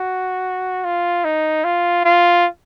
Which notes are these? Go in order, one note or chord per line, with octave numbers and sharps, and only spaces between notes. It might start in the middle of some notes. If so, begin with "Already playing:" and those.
Already playing: F#4
F4
D#4
F4
F4